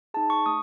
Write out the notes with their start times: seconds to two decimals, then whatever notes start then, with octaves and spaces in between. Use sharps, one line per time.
0.14 D#4 G#4 A5
0.30 C#6
0.46 A3 D#6